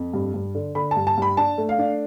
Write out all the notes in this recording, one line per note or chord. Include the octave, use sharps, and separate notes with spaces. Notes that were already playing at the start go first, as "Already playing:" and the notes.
Already playing: F2
G2
G2
D3
D3 B5
A5
G2
A5
G2 B5
D4 A5
A3
F5
D4